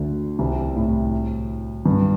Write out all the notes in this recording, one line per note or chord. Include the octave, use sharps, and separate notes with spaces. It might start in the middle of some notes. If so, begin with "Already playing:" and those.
Already playing: D2 D3
C2 C3
A2
G2